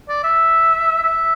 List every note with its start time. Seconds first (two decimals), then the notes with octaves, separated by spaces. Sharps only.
0.08 D5
0.24 E5
1.03 E5